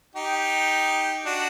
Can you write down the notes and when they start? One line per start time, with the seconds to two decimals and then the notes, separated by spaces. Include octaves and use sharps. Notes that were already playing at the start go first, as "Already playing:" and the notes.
0.15 D#4 G4
1.26 D4 F#4